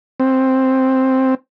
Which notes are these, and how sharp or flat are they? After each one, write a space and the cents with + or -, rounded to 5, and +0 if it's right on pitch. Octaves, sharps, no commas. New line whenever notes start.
C4 +5